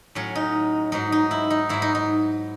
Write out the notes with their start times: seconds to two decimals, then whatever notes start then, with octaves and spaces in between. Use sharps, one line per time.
0.15 A2 F#3 C#4
0.35 D#4
0.92 G#2 F#3 D#4
1.12 D#4
1.31 E4
1.50 D#4
1.69 G#2 F#3 E4
1.82 D#4
1.95 D#4